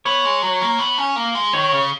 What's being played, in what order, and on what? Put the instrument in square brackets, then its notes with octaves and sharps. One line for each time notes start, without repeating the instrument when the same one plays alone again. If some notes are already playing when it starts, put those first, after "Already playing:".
[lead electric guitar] B3 [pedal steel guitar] C#5
[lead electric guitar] G#3
F#3
A#3
B3
C#4
A#3
G#3
[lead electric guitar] D#3 [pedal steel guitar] C#5
[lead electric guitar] C#3